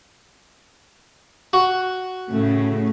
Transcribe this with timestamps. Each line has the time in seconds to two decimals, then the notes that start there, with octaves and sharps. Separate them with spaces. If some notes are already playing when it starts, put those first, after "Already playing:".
1.53 F#4
2.31 A2 C#3 A3